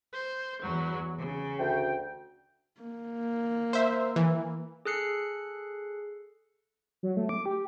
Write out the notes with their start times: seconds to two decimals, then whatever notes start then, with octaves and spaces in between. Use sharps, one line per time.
0.13 C5
0.61 E2 F#3
1.18 C#3
1.59 D2 G5
2.81 A#3
3.73 C5 E5
4.16 E3
4.85 G#4 A4 F#6 C7 C#7
7.03 F#3
7.17 A3
7.29 D6
7.46 G4